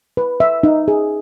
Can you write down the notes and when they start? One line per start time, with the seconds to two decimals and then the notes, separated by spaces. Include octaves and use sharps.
0.17 B4
0.40 E5
0.63 D#4
0.88 G#4